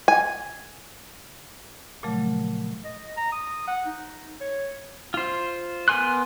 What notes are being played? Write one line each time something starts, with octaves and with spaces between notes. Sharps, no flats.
G#5
A#2 C#3 F3 F#3 A3
D#5
A#5
D#6
F#5
D#4
C#5
F4 C5
B3 A#4 G#5 C6 F#6